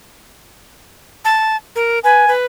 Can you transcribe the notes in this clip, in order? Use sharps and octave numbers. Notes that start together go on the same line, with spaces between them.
A5
A#4
B4 G#5
B4